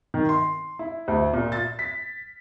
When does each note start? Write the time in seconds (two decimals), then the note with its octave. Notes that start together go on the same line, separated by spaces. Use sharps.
0.14 D#3
0.29 C6
0.79 E4
1.08 D2
1.33 A#2
1.52 A6
1.79 B6